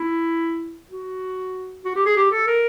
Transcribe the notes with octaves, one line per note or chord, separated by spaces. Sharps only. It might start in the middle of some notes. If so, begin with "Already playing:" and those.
Already playing: E4
F#4
F#4
G4
G#4
G4
A4
A#4